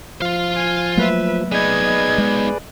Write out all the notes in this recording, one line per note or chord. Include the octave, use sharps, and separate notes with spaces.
F3 F4 F5
G#5
F#3 A3 A#3 B4 E5
B3 D#4 G#4 B4 D5 D#5 G#6
G#3